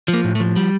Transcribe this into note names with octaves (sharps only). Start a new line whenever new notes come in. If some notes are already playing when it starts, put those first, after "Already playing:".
F3
A#3
A2
A3
F3
G3